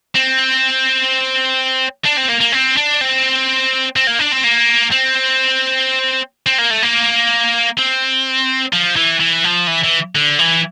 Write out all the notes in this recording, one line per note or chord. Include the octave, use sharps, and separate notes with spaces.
C4
D4
C4
A#3
A#3
C4
D4
C4
C4
A#3
D4
C4
A#3
C4
C4
A#3
A3
A#3
C4
F3
E3
E3
F3
E3
E3
D3
E3